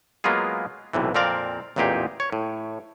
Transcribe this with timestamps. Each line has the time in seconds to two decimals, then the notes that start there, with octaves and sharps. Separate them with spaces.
0.24 F#3 G#3 A#3 B3 F4 G#4
0.93 B1 A2 C3 E3
1.14 F2 A#2 C4 A#4 D5 F5
1.76 A1 E2 A#2 D#4 G4 G#4
2.20 C#5
2.32 A2